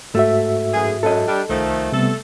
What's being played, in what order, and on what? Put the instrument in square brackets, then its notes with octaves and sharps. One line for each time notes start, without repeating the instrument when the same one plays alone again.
[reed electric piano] G#2 F#4 E5 [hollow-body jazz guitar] A3
[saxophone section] F#2 E3 G#4
[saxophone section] F#2 [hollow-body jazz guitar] A4 D#5
[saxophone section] G3 D4
[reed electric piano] C2 [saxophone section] D#3 F3 A3
[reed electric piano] C3 G3 B3 [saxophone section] A3 A4